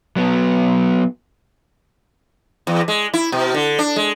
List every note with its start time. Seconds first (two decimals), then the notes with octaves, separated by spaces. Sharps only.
0.17 F#3 B3
2.67 E2
2.88 G#3
3.14 E4
3.32 B2
3.54 D3
3.79 D4
3.96 G#3